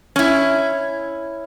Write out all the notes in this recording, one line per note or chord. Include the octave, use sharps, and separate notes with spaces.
C#4 E4